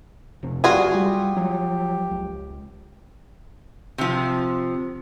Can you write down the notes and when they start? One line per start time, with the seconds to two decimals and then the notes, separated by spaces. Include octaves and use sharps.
0.43 F1 C3
0.64 F#1 G3 F4 F#4 G#4
0.94 G3 G4
1.36 F3 F#3
2.11 C#2
3.98 C3 F3